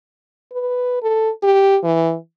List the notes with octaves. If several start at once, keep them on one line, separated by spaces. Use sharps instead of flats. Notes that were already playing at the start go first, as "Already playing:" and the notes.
B4
A4
G4
E3